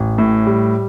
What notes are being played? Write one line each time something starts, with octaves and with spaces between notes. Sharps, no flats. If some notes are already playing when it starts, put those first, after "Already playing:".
Already playing: A1
A2
G3